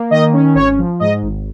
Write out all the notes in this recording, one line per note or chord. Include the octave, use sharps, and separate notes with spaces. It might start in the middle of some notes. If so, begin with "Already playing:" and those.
Already playing: A#3
D#3 D#5
C#4
G#1 C#5
F3
G#2 D#5
G#1